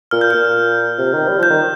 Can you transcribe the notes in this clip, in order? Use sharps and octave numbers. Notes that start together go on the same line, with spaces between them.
A#2 F6
G6
A#2 F6
C3
D#3
G3
F3 G6
D#3